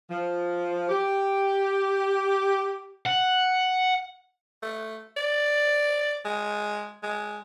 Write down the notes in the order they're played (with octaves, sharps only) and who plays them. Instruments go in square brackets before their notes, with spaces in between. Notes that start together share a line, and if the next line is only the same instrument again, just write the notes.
[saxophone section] F3
G4
[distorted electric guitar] F#5
[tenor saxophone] A3
D5
G#3
G#3